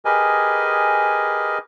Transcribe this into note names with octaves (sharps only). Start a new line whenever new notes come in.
G4 G#4 A#4 B4 D#5 G#5